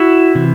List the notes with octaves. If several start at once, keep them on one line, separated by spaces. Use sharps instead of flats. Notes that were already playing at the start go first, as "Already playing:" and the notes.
Already playing: E4 F#4
C3 E3